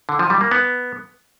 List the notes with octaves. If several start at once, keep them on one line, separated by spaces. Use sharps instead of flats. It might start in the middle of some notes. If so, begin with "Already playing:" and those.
D3
F3
G3
A#3
B3